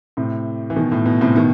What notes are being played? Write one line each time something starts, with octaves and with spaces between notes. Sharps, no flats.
A2 C3
E3
B2 D#3
A2
B2
A2 C3
B2 D#3